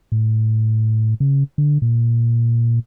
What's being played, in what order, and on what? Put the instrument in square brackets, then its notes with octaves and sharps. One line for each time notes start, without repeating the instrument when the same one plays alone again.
[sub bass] A2
C#3
D3
A#2